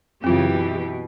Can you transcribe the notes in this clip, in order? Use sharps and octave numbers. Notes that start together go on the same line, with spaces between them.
F#2 C#3 E3 C4 F4 G4
B2